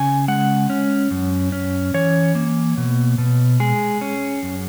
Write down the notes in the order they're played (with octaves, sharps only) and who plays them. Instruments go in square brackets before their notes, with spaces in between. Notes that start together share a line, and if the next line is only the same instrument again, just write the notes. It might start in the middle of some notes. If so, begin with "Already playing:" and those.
Already playing: [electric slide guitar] C#3 G#5
G#3 F#5
C#4
F#2
C#4
E3 C#5
A#3
B2
B2
G#3 G#4
C#4
F#2